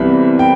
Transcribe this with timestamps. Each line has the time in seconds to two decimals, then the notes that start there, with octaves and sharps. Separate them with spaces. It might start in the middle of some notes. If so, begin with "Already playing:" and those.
Already playing: C2 C3 E3 G3 B3 B5
0.39 G5